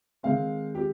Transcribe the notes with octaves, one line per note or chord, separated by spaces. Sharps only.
D#3 G#3 C4 F5
G4